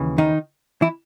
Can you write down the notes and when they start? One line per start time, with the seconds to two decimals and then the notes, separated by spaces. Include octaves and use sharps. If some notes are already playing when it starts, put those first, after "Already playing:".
Already playing: D#2 C#3 E3
0.18 D#3 D#4
0.82 E3 E4